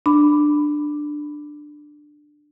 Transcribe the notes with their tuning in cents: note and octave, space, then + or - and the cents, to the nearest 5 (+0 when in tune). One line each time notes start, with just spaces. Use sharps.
D4 +15 B5 +10